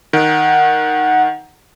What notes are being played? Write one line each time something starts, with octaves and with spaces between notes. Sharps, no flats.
D#3 F#5